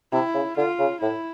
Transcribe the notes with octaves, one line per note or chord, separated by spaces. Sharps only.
C3 E4
C#3
D3 F4
C#3
A2 E4